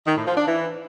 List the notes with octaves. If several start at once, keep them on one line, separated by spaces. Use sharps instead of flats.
D#3
A2
F3
D4
E3